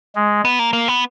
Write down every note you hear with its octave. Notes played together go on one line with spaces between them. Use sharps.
G#3
B3
A#3
A#3
B3